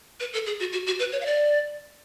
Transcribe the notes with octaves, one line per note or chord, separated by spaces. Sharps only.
B4
A4
G#4
F#4
F#4
F#4
B4
C#5
F5
D5